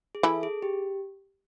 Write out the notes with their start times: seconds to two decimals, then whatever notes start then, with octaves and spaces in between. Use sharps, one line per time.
0.15 G#4
0.23 E3 E4 A4
0.43 G#4
0.62 G4